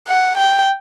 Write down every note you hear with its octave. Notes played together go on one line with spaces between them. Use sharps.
F#5
G5